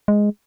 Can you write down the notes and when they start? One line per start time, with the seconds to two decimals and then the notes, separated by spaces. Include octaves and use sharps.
0.08 G#3